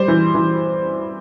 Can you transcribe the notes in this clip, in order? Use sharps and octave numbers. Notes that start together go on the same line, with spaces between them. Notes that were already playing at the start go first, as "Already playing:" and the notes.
Already playing: G3 C5
E3
E3